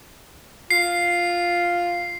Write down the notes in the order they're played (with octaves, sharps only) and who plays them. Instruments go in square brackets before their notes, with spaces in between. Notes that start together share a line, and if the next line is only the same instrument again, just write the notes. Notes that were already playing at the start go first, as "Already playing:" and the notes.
[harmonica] F4 [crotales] C7